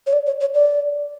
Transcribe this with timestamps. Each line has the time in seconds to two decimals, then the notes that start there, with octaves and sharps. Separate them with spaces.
0.07 C#5
0.13 D5
0.27 C#5
0.41 C#5
0.54 D5